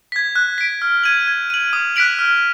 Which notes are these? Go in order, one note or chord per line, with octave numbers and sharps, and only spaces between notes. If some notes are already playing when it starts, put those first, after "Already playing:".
G#6 B6
F#6
B6 D7
F6
G#6 D#7 F#7
G#6
D#7 F#7
D#6
F#6 B6 D7 F#7
F6